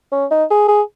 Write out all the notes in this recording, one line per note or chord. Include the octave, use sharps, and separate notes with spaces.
C#4
D#4
G#4
G#4